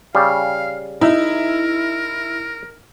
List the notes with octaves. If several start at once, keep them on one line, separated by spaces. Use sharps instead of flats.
C#3 G3 F5
D#4 E4 A#4